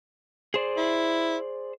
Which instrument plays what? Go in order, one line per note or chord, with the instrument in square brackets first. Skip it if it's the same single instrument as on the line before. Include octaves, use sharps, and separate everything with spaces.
[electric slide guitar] G#4 C5 D5
[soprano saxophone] E4